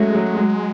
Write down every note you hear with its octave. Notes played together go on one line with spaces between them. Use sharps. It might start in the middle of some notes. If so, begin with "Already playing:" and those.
Already playing: F#3 G#3 A3 C#4 F#4
F#3
F#3